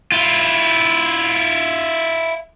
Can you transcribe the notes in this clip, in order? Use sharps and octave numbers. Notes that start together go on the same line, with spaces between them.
E4 F4